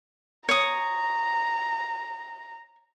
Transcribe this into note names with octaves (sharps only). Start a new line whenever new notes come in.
C#5 A#5 D#6